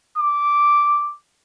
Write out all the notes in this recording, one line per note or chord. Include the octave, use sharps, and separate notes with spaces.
D6